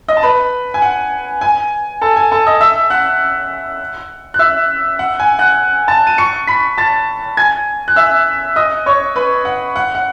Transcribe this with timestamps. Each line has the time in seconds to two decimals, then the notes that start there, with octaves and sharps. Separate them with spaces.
0.08 D#5 D#6
0.17 A5
0.23 B4 B5
0.74 G#5
0.82 F#5
1.41 G#5
2.01 A4 A5
2.16 G#5
2.31 A4 A5
2.46 D#5 D#6
2.61 E5 E6
2.90 F#5 F#6
4.34 F#6
4.39 E5 E6
4.99 F#5
5.20 G#5
5.39 F#5 F#6
5.88 A5 A6
6.07 D#7
6.18 C#6 C#7
6.47 B5 B6
6.78 A5 A6
7.37 G#5 G#6
7.88 F#6
7.96 E5 E6
8.56 D#5 D#6
8.86 C#5 C#6
9.16 B4 B5
9.45 F#5
9.76 F#5
9.95 F#5